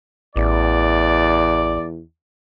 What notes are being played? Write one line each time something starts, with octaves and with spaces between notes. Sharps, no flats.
A1 E2 D5